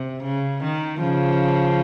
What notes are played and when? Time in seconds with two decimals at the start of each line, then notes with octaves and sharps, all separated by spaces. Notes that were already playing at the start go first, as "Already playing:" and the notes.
Already playing: C3
0.23 C#3
0.63 D#3
1.01 C#3 F3